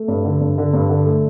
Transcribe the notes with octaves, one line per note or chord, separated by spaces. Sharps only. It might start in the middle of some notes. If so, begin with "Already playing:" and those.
Already playing: A3
G2
D3
G2
D3
G2
D3
A3